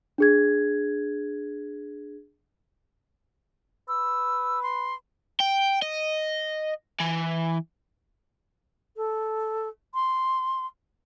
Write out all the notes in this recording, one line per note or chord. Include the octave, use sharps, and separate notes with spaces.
D4 G#4 G#6
B4 E6
C6
G5
D#5
E3
A4
C6